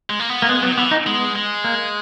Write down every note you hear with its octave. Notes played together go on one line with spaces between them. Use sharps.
G#3
A#3
B3
A#3
G#3 B3
F#3 B3
D#3
E3 B3
D#4
G#3 B3
G#3
A#3